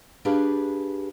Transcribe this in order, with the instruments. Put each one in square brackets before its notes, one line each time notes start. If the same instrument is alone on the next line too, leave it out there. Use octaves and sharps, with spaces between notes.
[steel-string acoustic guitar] D4 G4 G#4 B4 F5